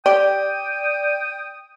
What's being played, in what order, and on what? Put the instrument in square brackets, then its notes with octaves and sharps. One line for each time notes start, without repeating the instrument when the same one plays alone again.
[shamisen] G4 [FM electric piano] D5 [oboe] G5 [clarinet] D#6